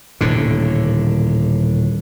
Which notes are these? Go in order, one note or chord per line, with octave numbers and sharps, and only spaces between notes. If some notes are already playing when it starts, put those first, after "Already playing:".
D#1 A2 D3